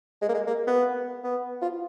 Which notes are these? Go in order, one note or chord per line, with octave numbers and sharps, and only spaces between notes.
G#3
A#3
G#3
A#3
B3
B3
F4